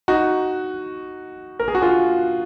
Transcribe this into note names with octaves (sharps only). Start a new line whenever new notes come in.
D#4 F#4
A#4
G#4
F#4
F4 G#4